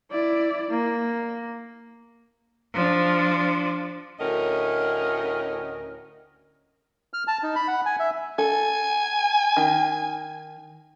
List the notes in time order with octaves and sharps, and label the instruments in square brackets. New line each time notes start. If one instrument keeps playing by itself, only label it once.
[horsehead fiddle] E4 D5
A#3
[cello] F3 D4
[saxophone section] D2 A2 C#4 A#4 D#5
[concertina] F6
A5
D#4
B5
F#5
G#5
E5
[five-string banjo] A4 [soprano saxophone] G#5
[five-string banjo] D#3